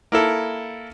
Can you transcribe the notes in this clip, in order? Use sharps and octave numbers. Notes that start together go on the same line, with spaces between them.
A#3 E4 A4